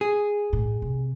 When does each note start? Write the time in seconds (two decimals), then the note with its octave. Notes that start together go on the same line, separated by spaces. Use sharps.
0.01 G#4
0.53 A2
0.82 C3